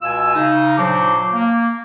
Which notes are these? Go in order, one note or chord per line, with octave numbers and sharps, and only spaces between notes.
C#2 B2 F4 G#5 E6
C#3 D#4
A#2 F#3 D4 C5 D6
A#3